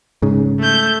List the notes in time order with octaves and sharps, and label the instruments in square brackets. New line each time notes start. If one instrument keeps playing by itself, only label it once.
[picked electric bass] G#2 C#3
[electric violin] A3 G6